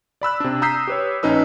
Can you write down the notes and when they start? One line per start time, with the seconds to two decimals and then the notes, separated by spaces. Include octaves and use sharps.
0.22 D5 B5 E6 F#6
0.40 C3 D4
0.62 A#5 D#6 E6 G6 B6 C7
0.87 G4 B4 C#5
1.23 A#1 C#4 D#4 B4 E6